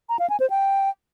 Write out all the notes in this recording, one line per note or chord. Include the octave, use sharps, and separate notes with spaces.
A#5
F5
G#5
C5
G5